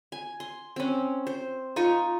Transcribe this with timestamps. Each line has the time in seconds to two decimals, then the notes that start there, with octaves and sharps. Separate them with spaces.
0.12 G#5
0.40 C6
0.76 C4 C#4
1.27 C5
1.76 D#4 F4 D#5 C#6